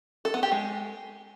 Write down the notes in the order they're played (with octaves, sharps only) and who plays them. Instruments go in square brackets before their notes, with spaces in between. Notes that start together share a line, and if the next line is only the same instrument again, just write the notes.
[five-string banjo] A4
B3
G4
G#3